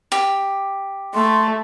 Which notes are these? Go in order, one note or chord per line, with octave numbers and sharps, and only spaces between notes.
G4
A3 C6